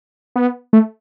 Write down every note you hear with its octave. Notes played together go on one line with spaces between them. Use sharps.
B3
A3